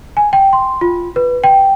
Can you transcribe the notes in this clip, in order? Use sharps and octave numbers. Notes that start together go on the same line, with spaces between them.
G#5
G5
C6
F4
B4
G5